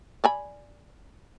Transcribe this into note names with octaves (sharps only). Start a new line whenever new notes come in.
D5 G#5 B5